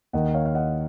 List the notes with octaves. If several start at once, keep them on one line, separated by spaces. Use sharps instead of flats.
D#2 D#3 D#5 F#5
C#5 F5
F5
D#5 F#5